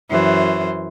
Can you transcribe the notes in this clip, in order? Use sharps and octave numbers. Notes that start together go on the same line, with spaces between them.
F#2 E3 C5